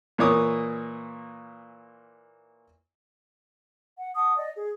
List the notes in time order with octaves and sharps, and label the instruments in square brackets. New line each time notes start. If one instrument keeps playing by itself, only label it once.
[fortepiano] A#2 E3 A#3 C#5 D6 D#6
[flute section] F#5
F#5 A5 D#6
D5 D#5
G#4